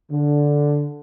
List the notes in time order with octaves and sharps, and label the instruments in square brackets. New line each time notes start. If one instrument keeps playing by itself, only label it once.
[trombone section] D3